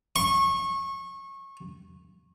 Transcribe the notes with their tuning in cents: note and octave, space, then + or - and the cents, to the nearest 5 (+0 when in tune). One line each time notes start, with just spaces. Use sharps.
C#6 -25